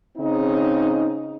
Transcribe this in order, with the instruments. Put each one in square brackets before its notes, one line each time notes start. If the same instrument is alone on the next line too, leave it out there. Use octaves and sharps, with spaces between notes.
[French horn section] C#3 C4 D#4